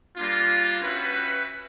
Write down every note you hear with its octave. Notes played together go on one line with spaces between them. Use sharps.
G3 A#3 D4 F4
C#4 F#4 B4 E5 G5